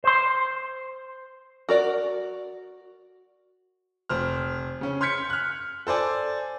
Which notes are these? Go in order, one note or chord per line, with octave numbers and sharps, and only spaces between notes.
C5 C6
F#4 A#4 D5
F1 C5 F6
C#3 C#4
C6 F6 G6 G#6 B6 C#7
F6 F#6
A4 C5 D5 G#5